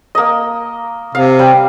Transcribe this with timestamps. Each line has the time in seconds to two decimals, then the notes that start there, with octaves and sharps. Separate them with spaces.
0.15 A#3 D#5
1.15 C3 F5
1.39 G3